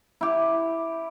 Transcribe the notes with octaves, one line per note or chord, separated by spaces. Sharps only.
E4 G4